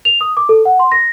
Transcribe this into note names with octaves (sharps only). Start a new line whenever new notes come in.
F7
D#6
D6
A4
F#5
C6
A#6